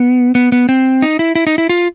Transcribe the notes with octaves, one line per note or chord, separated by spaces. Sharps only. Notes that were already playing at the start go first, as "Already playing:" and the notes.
Already playing: B3
B3
B3
C4
D#4
E4
E4
D#4
E4
F4